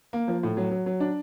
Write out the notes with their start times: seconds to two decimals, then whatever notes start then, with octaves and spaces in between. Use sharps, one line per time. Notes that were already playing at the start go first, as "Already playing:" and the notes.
0.13 A#3
0.28 F3
0.43 A2
0.57 F#3
0.71 F#3
0.86 F#3
1.00 D4